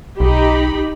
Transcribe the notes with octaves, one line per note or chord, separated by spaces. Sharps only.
B1 D#4 G4 B5